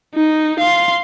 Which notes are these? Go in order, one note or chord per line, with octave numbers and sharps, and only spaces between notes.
D#4
F5 C6